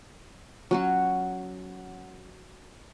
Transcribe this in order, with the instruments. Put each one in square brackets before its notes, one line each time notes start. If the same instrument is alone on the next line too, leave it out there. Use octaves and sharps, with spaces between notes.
[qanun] F#3 C#4 F#4